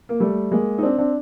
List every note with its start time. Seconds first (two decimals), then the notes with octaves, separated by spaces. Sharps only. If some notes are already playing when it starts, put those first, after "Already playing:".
0.09 A#3
0.20 G3 A3
0.52 G#3 A#3
0.78 D#4
0.83 C4 D4
0.98 C4 D4